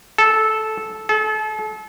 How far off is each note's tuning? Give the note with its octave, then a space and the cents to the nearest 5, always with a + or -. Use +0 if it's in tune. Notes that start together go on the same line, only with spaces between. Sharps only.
A4 -10
A4 -35